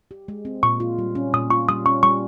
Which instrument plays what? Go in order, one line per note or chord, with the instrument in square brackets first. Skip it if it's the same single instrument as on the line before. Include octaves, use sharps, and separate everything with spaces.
[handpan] G4
G#3
C4
[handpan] A#2 [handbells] C#6
[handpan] F4
G3
C#4
[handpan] A#2 [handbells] D#6
[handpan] F4 [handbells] C#6
[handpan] G3 [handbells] D#6
[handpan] C#4 [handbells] C#6
[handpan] G3 [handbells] C#6